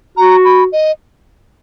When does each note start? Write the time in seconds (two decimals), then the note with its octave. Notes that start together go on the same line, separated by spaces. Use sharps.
0.17 F#4 A#5
0.45 B5
0.72 D#5